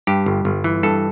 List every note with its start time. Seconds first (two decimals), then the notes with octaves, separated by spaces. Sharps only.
0.07 G2 G4
0.26 G1
0.45 G1
0.64 E3
0.83 G2 A4